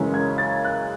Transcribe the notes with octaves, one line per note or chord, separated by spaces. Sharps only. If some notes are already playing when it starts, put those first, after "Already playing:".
Already playing: F#2 C#3 E3 G#3 C#4
G#6
A6
F#6